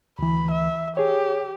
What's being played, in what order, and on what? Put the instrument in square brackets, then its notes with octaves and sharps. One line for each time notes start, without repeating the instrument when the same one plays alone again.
[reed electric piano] D2 E3 [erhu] B5
[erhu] E5
[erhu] G4 [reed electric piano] G#4 C#5